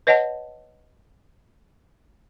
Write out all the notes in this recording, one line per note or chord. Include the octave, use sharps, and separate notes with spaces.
B4 C#5 D#5 F#5 A5